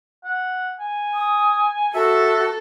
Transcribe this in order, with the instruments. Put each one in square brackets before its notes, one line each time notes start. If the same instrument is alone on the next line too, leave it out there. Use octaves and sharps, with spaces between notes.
[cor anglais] F#5
G#5
[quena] D#6
[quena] F#4 [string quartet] A4 [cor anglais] E5